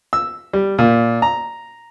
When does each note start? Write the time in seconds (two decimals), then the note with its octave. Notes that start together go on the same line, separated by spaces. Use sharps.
0.13 E6
0.53 G3
0.79 A#2
1.22 A#5